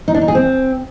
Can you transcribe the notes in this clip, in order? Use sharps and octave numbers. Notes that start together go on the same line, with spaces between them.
D#4
D4
D#4
G#4
C4